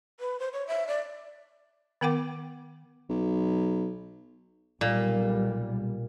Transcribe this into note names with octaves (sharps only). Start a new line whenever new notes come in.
B4
C5
C#5
E5
D5
D#3 B3 A#4 F#5 G5 D6
B1
B1 A#2 G3